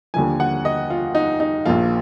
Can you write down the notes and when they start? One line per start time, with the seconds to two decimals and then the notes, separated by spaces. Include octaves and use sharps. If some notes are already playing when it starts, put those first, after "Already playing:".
0.14 D#2 D3 F3 G#5
0.40 F#5
0.65 D#5
0.90 F4
1.15 D#4
1.40 D#4
1.66 A#1 A#2 F3 F4